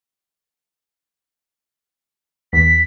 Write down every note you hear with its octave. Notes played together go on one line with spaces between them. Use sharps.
E2 B6